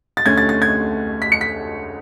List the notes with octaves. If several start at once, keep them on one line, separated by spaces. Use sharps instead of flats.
A6
D2 D3 A3 C#4 G#6
A6
A6
G#6
B6
C#7
B6